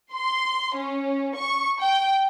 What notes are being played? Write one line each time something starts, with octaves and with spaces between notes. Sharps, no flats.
C6
C#4
C#6
G5